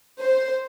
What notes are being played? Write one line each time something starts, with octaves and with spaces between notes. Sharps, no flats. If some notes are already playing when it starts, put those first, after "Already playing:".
C5